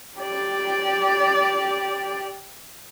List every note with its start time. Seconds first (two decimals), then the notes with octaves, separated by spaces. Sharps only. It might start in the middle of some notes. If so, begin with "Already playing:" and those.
0.18 G4 D5